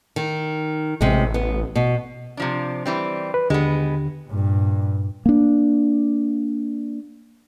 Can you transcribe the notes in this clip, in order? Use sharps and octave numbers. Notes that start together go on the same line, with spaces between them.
D#3
A1 C3 G#3
B3
B2
C3 F3 D4
E3 G3 C4
B4
D#2 D3 G#3 B3 G4
G2 A#2
A#3 D4